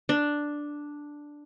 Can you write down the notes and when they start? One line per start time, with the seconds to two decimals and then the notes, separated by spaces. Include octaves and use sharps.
0.09 D4